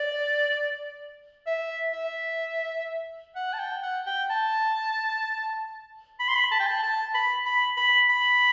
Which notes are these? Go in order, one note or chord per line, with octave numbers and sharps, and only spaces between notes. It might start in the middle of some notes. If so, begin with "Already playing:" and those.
Already playing: D5
E5
E5
F#5
A5
G5
F#5
G5
A5
B5
C6
B5
A5
G5
A5
A5
B5
B5
B5
B5